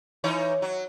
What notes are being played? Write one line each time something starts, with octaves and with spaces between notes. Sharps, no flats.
E3 D#4 C#5
F#3